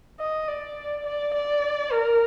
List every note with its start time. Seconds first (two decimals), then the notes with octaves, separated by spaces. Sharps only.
0.20 D#5
0.48 D5
1.06 D5
1.35 D5
1.91 A#4